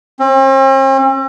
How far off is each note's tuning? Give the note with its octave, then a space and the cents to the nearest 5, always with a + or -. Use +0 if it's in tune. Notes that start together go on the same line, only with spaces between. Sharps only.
C4 +45